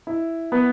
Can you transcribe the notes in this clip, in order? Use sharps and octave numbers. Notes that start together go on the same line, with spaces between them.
E4
B3